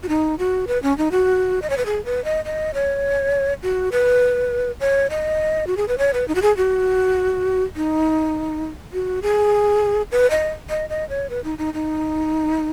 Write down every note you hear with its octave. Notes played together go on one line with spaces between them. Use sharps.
F#4
D#4
F#4
B4
C#4
D#4
F#4
D#5
C#5
B4
G#4
B4
D#5
D#5
C#5
F#4
B4
C#5
D#5
F#4
G#4
B4
C#5
B4
D#4
F#4
G#4
F#4
D#4
F#4
G#4
B4
D#5
D#5
D#5
C#5
B4
D#4
D#4
D#4